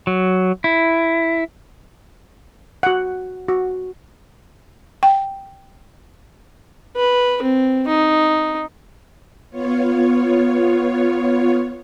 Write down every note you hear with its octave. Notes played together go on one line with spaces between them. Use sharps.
F#3
E4
F#4 F#5
F#4
G5
B4
C4
D#4
B3 F4 C#5